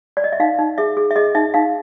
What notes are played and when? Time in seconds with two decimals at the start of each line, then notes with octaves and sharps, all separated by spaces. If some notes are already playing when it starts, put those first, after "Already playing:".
0.17 D5
0.24 D#5
0.32 E5
0.40 D#4 F5
0.59 D#4
0.78 G#4 E5
0.97 G#4
1.11 E5
1.16 G#4 D#5
1.35 D#4 E5
1.54 D#4 F5